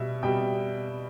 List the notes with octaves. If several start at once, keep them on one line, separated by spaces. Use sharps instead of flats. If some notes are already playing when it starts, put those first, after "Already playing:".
Already playing: B2 G3 E5
B2 G3 G5